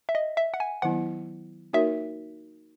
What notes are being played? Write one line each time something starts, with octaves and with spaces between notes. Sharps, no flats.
E5
D#5
E5
F#5
G#5
D#3 F#3 B3 E4 F#5
A#3 D#4 F#4 A#4 C#5 E5